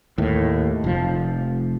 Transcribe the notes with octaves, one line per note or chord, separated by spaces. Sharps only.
D#2 A2
F1 F3